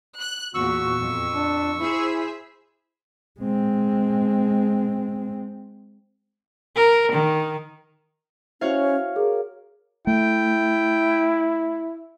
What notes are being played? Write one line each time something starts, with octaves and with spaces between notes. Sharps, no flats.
F#6
E2 A#2 F#4 C#6 E6
F2
D4
E4 G#4 C5 E5
G#3 C4
A#4
D#3
C#4 E4 F#4 C5 C#5 E5 F5
G#4 A#4
A3 E4 G5